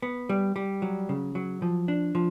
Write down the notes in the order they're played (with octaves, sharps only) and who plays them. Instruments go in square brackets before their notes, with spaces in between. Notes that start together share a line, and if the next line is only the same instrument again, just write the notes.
[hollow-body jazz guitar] B3
G3
G3
F#3
C#3
F#3
F3
D4
F3